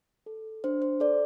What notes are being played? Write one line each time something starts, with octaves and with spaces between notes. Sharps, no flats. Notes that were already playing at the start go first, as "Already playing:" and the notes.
A4
D4 C5
C5
A4 D5